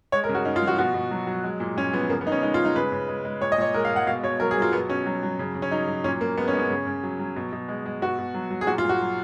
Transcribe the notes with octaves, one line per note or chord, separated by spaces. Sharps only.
G#3 C#5
A#4
C#3
F#4
C#3 D#4
F4
F3
F#4
B2 F#4
B2
F#3
F#3
G#3
A#2
A#2 C#4
F3 B3
C#3 A#3
B3
C#3 D#4
C#4
G#3 D#4
F4
G#3
D#4
C#3 B4
C#3
G#3
G#3
A#2 C#5
D#5
A#2 C#5
G#3 A#4
F5
G#3
F#5
B2 F5
B2 C#5
F#3 A#4
G#4
F#3 F4
B2 B3
B2 C#4
F#3
F#3
C#3
C#3
C#4
F#3 D#4
F#3
A#2 C#4
A#2 A#3
G#3 B3
C#4
G#3
C#4
C#3
C#3
F#3
F#3
B2
B2
G#3
G#3
B2 F#4
B2
F#3
F#3
G#4
A#2 F#4
F4
A#2
F#4
F#3